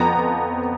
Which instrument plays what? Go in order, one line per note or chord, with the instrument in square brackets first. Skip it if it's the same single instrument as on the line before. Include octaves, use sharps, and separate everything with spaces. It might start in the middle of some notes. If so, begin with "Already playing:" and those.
Already playing: [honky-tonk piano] F2 F3 B3 A#5